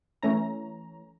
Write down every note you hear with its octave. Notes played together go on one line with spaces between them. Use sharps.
E3 A3 C#4 A#5